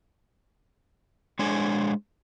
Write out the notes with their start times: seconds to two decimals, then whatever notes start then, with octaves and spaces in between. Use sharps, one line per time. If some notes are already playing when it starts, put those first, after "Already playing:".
1.39 G#3 D4 C5 C#5 G#5